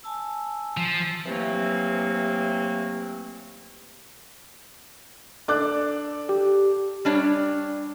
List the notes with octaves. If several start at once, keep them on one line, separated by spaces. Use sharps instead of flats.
G#5 A5 E6
F3
C3 E3 F#3 A3 A#3 C4
D4 A4 D5 D6 F#6
G4
G3 D4 C#5 D5